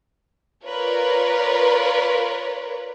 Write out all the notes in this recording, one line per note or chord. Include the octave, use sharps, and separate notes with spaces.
F4 A#4 B4 C#5 D5